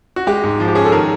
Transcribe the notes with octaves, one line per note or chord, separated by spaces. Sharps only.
F#4
G#3 G4
G#2
F3
G4
C#4 G#4
A4
D#3 G#4 A#4